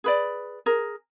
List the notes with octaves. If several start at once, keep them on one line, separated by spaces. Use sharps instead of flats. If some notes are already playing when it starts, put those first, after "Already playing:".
G#4 B4 D5
G#4 A#4